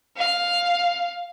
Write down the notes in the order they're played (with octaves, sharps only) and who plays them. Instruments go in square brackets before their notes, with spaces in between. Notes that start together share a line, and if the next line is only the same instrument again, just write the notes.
[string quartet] F5